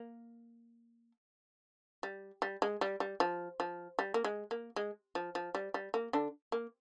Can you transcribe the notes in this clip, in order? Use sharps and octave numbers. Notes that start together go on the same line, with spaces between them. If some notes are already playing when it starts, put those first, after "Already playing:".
Already playing: A#3
G3
G3
G#3
G3
G3
F3
F3
G3
A#3
G#3
A#3
G#3
F3
F3
G3
G3
A#3
D3 D4
A#3